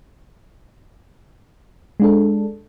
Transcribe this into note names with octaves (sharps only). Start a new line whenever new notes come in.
G#3 D4 A4